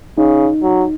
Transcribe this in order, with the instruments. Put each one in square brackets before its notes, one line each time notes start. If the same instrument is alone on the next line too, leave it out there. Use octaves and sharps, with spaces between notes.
[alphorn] C#3 [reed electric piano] D#4
[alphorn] F#3